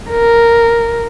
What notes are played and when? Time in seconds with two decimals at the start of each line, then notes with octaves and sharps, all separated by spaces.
0.11 A#4